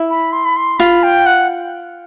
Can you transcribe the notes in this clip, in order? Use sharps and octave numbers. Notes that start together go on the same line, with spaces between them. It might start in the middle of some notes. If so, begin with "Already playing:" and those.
Already playing: E4
B5
C6
B5
C6
F4 B5
G5
F#5